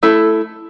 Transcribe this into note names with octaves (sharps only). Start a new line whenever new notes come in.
A3 E4 A4